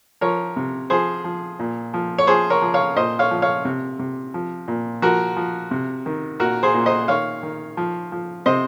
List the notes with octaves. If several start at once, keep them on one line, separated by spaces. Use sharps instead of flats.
F3 A#4 C#5
C3
F3 G#4 C5
F3
A#2
F3
C#5
F3 G#4 C5
A#4 C#5
F3
C#5 F5
A#2 C5 D#5
C#5 F5
F3
C#5 F5
C3
C3
F3
A#2
F3 F#4 A#4
F3
C3
D#3
A#2 F#4 A#4
G#4 C5
A#2
C5 D#5
D#3 C#5 F5
D#3
F3
F3
C3 C5 D#5